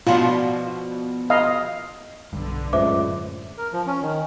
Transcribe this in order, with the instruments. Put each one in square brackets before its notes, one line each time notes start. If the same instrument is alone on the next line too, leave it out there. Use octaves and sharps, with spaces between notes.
[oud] B2 F3 D4 [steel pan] F4
[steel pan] D#5 F5
[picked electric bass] B1 G2 [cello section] D3
[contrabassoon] C#2 [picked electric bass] F#2 A2 [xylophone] C5 E5 D6
[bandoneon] A#4
F3
C#4
D#3